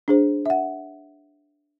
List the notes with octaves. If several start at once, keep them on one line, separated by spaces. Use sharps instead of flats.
D4 G#4 C5
E5 F#5